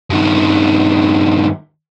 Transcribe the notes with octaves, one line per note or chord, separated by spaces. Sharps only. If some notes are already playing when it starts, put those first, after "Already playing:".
G2 D#3